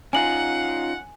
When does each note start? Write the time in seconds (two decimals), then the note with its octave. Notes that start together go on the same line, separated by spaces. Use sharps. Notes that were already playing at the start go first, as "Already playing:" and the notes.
0.13 C#4 D#4 F4 F#5 G#5 F#7